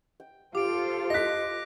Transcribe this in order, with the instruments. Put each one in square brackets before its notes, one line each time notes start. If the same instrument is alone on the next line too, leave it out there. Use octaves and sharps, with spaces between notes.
[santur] G5
[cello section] F4 A4 C5 [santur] G4 [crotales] D6 D7
[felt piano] D#5 B6 [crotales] F#6 A#6